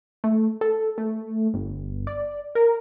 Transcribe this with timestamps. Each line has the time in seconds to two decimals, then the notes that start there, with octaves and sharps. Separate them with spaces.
0.24 A3
0.61 A4
0.98 A3
1.54 G1
2.07 D5
2.55 A#4